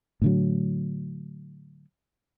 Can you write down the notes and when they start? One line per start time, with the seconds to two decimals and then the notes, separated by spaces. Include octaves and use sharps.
0.22 A2 D3 F#3